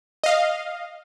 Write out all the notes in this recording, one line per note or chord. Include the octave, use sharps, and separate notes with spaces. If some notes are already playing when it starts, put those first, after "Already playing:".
D#5 F5